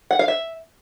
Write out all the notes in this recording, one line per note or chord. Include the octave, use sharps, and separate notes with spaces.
F#5
F5
E5